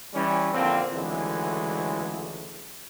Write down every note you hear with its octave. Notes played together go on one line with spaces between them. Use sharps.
E3 G3 C#4
A#1 D3 F3 A#3 C4
C#2 D3 E3 F#3 G#3 A3